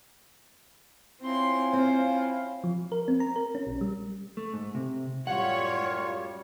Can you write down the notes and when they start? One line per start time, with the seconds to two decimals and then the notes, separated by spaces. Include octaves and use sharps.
1.22 C4 C#4 E4 F4 C6
1.73 C4 C5 F5
2.64 F3
2.92 A#4
3.08 C4
3.20 A#5
3.36 A#4
3.55 C#4
3.67 A#1
3.81 G3
4.37 A3
4.53 G#2
4.75 C3
5.27 F#2 A2 G3 F4 C#5 F#5